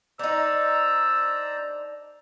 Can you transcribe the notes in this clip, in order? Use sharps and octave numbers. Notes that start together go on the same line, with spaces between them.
D4 D#4 C5 D5 A#5 E6